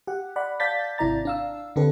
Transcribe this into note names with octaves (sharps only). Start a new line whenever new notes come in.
G4 F#5
D5 F#5 B5
D5 F5 A5 G6 A6 B6
G#1 C3 E4 D5 A#5 A6
D4 F5 E6
D3 C4 D4 G4 A4 B4